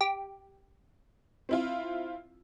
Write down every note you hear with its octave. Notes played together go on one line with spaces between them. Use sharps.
G4
C4 E4 F4